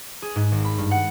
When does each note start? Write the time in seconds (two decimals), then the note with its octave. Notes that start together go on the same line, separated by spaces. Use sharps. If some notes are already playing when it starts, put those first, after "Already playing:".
0.22 G#4
0.36 G#2
0.52 G#1
0.65 B5
0.78 G2
0.91 F#5